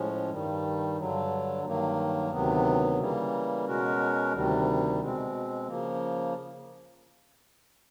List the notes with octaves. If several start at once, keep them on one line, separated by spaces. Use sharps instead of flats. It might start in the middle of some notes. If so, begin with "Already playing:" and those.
Already playing: A2 F3 G#3 C#4
G2 D#3 G3
G2 D3 F#3
G2 D#3 F#3 A#3
D2 C3 D#3 F#3 B3
C#3 E3 G3 A#3
B2 G#3 C#4 F#4 A#4
D2 C3 D#3 G3
B2 G#3 C4
C#3 F3 A#3